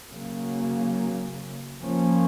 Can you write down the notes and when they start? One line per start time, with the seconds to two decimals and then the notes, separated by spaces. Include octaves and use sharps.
0.10 C#3 F#3 A#3
1.81 F3 A#3 C#4